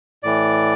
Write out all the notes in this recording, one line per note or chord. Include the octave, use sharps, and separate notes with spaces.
A2 E3 D5